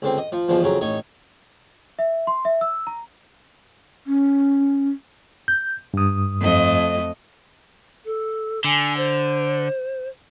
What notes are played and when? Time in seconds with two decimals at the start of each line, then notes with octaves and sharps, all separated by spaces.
0.02 C#2 D3 C4
0.18 D#5
0.32 F3
0.48 E2 B2 D3 F3
0.62 F2 C#3 F#3 A#5
0.81 A1 D#4 C#5
1.99 E5
2.27 C6
2.45 E5
2.61 E6
2.87 A#5
4.07 C#4
5.48 G6
5.94 G2 D#6
6.41 F2 A3 D#5
8.05 A4
8.64 D3 G#5
8.97 C5